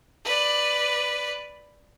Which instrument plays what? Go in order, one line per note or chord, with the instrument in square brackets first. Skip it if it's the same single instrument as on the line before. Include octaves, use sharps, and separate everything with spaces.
[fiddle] B4 D5